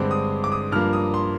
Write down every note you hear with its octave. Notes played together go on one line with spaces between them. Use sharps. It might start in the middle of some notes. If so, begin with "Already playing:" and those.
Already playing: G2 D3 G#3 C4 D6
D#6
D6
D#6
G2 F3 A#3 F6
D#6
C6